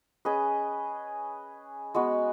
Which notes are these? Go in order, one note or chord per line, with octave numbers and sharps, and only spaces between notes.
C#4 G#4 B4 D#5
G#3 B3 F#4